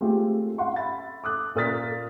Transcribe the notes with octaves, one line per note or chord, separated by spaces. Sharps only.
G#3 A3 C4 F4 G4
F5 F#5 C6 C#6
E5 B5 A6
D6 D#6 F#6
A#2 A#3 D#6 F6 A6 B6